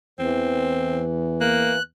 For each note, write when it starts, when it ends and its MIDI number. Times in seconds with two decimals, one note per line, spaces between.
0.19 1.86 40
0.19 1.79 52
0.19 1.02 60
1.41 1.75 58
1.41 1.83 90